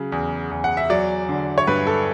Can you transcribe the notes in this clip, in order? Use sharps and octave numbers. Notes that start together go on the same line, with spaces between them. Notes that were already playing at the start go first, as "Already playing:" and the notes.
Already playing: C#3 F#3
E2
E2
F#5
E5
F#3 D5
D3
C#5
G2 B4
A4